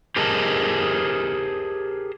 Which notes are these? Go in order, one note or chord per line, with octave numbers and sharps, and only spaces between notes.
G4 G#4 A#4 C5 D#5 A5